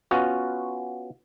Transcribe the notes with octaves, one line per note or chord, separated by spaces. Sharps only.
B3 C#4 F4 F#4